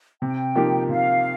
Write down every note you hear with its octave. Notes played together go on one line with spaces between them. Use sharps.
C3 G5
F3 A#3 D#4 G4
C3 F5